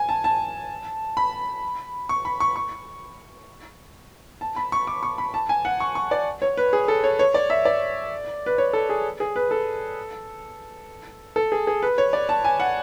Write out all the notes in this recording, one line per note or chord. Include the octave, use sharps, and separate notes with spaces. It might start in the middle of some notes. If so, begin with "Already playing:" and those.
Already playing: G#5
A5
A5
B5
C#6
B5
C#6
C#6
A5
B5
C#6
D6
C#6
B5
A5
G#5
F#5
C#6
C#6
D5
C#5
B4
G#4
A4
C#5
C#5
D5
E5
D5
B4
C#5
A4
G#4
G#4
B4
A4
A4
G#4
G#4
B4
C#5
D5
A5
G#5
F#5